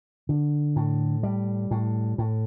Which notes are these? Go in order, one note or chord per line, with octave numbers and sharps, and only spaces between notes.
D3
A2
G3
A2
A2